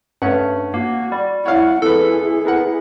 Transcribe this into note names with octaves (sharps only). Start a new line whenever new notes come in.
G2 A3 C#4 F#5
A#3 F#4
G3
E4 C#5 F5 F#5
F2 B3 E4 G#4 A4 B4
B3 A#4 F#5